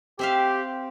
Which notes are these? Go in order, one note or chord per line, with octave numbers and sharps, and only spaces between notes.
C4 G4 E5 F5